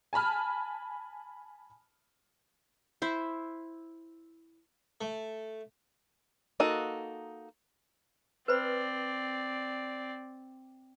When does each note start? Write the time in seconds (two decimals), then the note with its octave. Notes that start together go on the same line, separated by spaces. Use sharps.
0.13 G#5 A5 B5 F6
3.02 E4 C5
5.01 A3
6.60 A#3 D#4 F#4 A4
8.48 C4 B4 C5 D5 B5